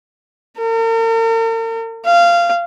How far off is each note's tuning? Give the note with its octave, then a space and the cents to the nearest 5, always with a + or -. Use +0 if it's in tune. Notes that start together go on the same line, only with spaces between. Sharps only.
A#4 -45
F5 -20